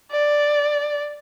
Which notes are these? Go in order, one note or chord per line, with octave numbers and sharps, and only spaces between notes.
D5